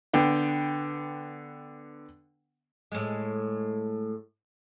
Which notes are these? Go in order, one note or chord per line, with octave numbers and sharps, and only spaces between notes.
D3 B3 G5
A2 G#3